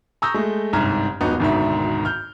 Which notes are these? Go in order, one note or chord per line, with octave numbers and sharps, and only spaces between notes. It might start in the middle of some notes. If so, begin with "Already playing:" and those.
A#5 C#6 D#6 E6 G6 A#6
G#3 A3
G1 C2 G#2 A#5 F6 G#6
D#1 G#2 B3 D#4 F#4 A#5
G#1 D2 G#2 B2 D#3 E5
F6 G6